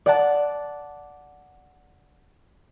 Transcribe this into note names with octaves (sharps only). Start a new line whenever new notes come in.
D5 F#5 A5